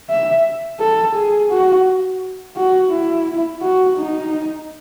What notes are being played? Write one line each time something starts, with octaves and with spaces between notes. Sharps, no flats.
E5
A4
G#4
F#4
F#4
E4
F#4
D#4